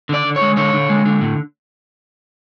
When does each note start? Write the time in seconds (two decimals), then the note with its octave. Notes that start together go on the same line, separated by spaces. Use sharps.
0.09 D3 D5
0.25 D3
0.36 C#5
0.41 G#3
0.57 D3 C#5
0.73 D3
0.89 G#3
1.05 D3
1.21 A2